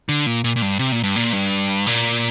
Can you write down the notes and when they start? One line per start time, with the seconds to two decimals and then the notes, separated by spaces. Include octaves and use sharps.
0.09 D3
0.26 A#2
0.44 A#2
0.56 A#2
0.62 G2
0.79 C3
0.92 A#2
1.03 G2
1.16 A#2
1.33 G2
1.87 A#2